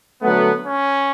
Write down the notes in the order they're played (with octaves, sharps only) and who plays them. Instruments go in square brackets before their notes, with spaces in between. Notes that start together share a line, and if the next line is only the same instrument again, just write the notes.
[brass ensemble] D3 F#3 A3 B3
C#4